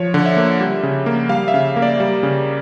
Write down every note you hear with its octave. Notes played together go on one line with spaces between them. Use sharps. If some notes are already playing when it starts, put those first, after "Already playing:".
Already playing: F3 C#5
D3
E5
A#3
G3
C#3
A#3
G3 F5
E5
C#3
A#3
D5
G3
C#3